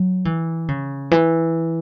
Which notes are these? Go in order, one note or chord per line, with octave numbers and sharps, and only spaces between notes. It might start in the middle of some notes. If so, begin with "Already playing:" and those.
Already playing: F#3
E3
C#3
E3